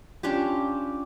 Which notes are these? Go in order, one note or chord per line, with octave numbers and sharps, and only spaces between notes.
C#4 D4 F4 G4